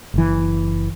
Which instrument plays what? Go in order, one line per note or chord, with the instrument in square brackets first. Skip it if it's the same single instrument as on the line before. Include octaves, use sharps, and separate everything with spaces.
[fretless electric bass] F#1 E3